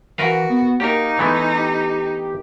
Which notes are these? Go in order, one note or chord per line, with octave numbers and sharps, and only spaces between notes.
E3 F#4 A#4 B4 F5
B3
A#3 D#4 G4 A#4
E3 G#3 A3 B3
G4